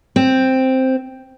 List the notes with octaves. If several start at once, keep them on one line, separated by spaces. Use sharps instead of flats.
C4